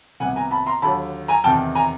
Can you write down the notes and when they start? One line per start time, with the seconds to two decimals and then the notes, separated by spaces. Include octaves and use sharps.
0.20 C2 C3 D#3 G3 B3 F#5 G#5
0.36 G#5 A#5
0.51 A5 B5
0.66 A#5 C6
0.82 D#2 D3 F#3 A5 B5
1.28 G#5 A#5
1.44 E2 C3 D#3 G5 A5
1.75 G#5 A#5